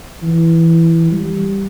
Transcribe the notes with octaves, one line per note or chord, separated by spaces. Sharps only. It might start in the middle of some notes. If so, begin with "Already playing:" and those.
E3
G3